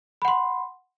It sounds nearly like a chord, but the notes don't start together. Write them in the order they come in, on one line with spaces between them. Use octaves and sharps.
B5 F#5 C6